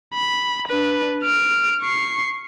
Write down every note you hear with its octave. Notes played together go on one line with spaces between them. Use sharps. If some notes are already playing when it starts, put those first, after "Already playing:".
B5
D4 B4
F6 D7
C#6 C7